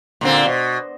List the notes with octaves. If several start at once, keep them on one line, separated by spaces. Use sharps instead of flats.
A#2 D3 C4
B2